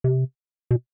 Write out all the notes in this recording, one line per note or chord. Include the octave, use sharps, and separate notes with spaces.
C3
B2